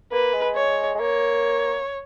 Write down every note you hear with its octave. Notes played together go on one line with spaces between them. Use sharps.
A#3 B4
G#3
C#5
G#3
A#3 C#5